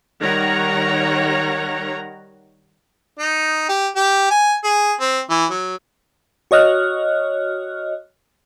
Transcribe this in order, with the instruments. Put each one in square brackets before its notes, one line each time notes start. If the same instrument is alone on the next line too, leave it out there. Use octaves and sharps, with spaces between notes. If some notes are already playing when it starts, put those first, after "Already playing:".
[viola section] D#3 G3 A#4 C#5 F#5 A#5
[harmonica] D#4
G4
G4
G#5
G#4
C4
E3
F#3
[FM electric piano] F#4 C#5 D#5 F6 F#6